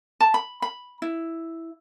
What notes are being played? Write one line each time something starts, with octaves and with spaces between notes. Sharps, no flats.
A5
B5
B5
E4